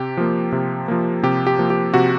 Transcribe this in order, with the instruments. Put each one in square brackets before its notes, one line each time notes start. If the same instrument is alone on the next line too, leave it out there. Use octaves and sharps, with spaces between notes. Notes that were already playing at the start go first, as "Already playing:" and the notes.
Already playing: [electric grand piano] C3 G4
F3 A#3
C3
F3 A#3
C3 G4
G4
F3 A#3
G4
C3 F#4